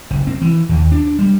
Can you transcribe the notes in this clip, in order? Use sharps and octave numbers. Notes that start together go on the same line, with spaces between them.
F#1
C4
E3
D#2
D4
G3